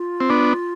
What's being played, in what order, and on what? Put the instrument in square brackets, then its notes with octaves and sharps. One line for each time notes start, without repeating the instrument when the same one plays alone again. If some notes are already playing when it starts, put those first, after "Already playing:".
Already playing: [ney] F4
[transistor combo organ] C4
B3 D4